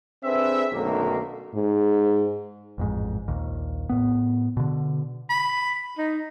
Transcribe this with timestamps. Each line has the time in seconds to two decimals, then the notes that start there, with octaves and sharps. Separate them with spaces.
0.24 C4 D4 G#4 A4 B4 E5
0.72 B1 F#2 D3 D#3 A3 A#3
1.55 G#2
2.78 A1 F2 G#2
3.28 A#1 D#2
3.89 A2 B3
4.57 B2 D3
5.30 B5
5.98 D#4